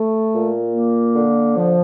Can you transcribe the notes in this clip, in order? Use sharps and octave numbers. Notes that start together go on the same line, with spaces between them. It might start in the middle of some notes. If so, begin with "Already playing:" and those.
Already playing: A3
A#2
A#3
D3
F3